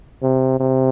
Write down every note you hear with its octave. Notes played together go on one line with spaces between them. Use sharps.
C3
C3